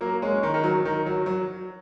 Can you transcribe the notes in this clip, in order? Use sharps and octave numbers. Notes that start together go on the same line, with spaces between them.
F#3 A#3
G#3 C#4
D#3
D#3
F#3
D#3
F#3
F#3